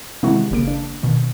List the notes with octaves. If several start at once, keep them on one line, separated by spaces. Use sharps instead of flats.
C3 D#3 E3 G#3 E4 F#4
G1 C#3 A#3 D7
D4
B2 D#3